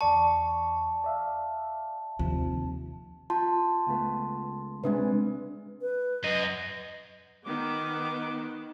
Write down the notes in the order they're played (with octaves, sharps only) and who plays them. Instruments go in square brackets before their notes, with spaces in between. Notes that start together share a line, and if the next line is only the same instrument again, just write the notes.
[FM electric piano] E2 D5 C#6 [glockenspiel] A5
[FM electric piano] D5 E5 F5
[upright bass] D#2 [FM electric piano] C3 F3
[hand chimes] F4 A5 C6
[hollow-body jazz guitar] C#2 A3 B3
[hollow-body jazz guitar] C3 G#3 [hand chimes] C4 D4 B4
[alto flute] B4
[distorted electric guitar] F#2 [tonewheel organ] D#5
[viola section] D#3 B3 [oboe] D6